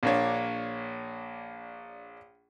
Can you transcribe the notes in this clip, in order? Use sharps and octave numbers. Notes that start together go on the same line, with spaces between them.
A#1 A#3 D4 C#5